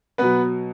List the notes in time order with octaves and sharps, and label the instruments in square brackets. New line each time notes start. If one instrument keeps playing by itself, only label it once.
[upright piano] B2 F#3 [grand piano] B3 B4